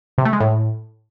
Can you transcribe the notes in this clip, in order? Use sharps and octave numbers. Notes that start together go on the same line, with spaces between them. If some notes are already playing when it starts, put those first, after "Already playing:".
C3
A3
G#3
A2